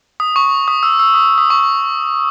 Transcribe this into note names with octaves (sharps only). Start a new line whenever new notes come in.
D#6
C#6
D#6
E6
E6
D#6
D#6
C#6